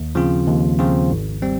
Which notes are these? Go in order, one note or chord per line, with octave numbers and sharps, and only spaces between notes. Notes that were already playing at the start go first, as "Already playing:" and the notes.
Already playing: D#2
C#3 F3 C4 F4
D#2
C#3 F3 C4 F4
G#1
G3 C4